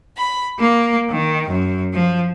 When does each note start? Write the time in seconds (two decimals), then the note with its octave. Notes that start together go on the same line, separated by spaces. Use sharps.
0.17 B5
0.59 A#3
1.11 D#3
1.49 F#2
1.93 F3